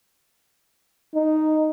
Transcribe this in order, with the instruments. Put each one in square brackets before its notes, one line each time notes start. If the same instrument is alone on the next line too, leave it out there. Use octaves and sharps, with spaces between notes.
[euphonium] D#4